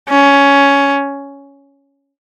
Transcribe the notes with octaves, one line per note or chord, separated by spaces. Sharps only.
C#4